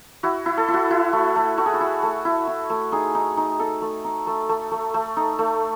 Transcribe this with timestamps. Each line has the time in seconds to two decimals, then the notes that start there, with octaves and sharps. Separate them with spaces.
0.23 E4 F#4
0.46 E4
0.57 A4
0.68 E4
0.74 F#4
0.90 E4 F#4
1.13 A3
1.36 A3
1.58 A3 F#4
1.66 G#4
1.74 F#4
1.80 E4
2.03 A3
2.25 E4
2.47 E4
2.70 A3
2.92 D#4 G#4
3.15 D#4
3.37 D#4
3.59 D#4 A4
3.82 A3
4.04 D#4
4.27 A3
4.49 A3
4.71 A3
4.94 A3
5.17 D#4
5.39 A3